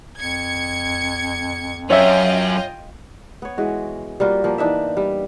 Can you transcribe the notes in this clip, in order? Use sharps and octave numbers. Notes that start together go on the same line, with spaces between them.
F2 G#6 C#7
F#2 C#4 F4 C#5 D#5 E5 G5
B3 C#5
E3 G#3 F#4
G3 A#3 F4 F#4
F3 A#3 B3
E3 D4 D#4 E5
G3